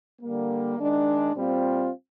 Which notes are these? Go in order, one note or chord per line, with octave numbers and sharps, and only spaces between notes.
D3 G3 A#3
D#3 G#3 D4
A#2 G3 C4 F4